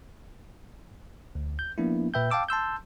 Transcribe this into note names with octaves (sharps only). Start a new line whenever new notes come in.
D2
G6
F3 A#3 B3 D4 E4
A#2 B4 E5 G5 G6
F5 G5 A5 D6 E6
A5 C6 E6 G6